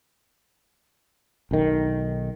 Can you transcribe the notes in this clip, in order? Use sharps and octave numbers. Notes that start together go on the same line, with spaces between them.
B1 D#3